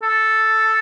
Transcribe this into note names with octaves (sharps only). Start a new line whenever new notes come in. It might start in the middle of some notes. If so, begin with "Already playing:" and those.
A4